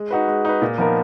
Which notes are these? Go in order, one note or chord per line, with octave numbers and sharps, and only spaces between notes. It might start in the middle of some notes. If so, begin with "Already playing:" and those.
Already playing: G#3
D#4 F#4 B4
G#3
D#4 F#4 B4
A#2
F3 B3 D#4 A#4